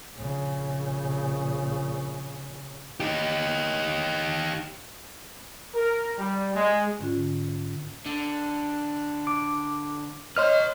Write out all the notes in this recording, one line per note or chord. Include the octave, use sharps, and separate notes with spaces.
A#1 C#3
D#4 G4
A#4
G3
G#3
G#2 D3 C#4 F4
D3
D6
B4 C#5 D#5 C6 F6